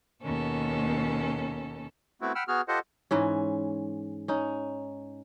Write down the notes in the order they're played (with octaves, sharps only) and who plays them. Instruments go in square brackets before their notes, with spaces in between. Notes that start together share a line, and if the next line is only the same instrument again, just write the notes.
[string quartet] D#2 B2 C#4 A4
[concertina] A3 B3 C4 E4 F#4
F#5 G5 B5 E6 F6
B3 F#4 G#4 F6
F4 G4 A4 C5 D#5 F#5
[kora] G#2 E3 C#4
C#4 D#4